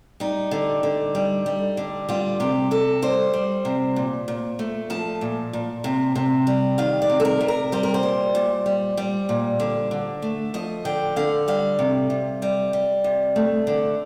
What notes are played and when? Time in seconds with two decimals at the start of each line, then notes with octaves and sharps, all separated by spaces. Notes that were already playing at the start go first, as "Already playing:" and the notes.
0.20 G3 D#4
0.51 D3
0.83 D3
1.15 G3
1.46 G3
1.77 D3
2.09 G3 F4
2.40 C3 G4
2.71 C3 A4
3.02 G3 C5
3.33 G3
3.65 C3
3.96 A#2
4.28 A#2
4.59 A3
4.90 F3 A5
5.21 A#2
5.53 A#2
5.84 C3
6.15 C3
6.47 G3
6.78 D#3 F5
7.02 D5
7.10 C3
7.20 A4
7.25 A#4
7.41 C3
7.48 A#4
7.72 G3 C5
7.83 A#4
7.94 C5
8.03 A#2
8.35 A#2
8.66 G3
8.97 G3
9.29 A#2
9.60 D3
9.91 D3
10.22 A3
10.54 F3 D#5
10.85 D3 G5
11.16 D3 F5
11.48 G3 F5
11.79 C3
12.10 C3
12.42 G3
12.73 G3
13.04 C3
13.36 A3
13.67 D3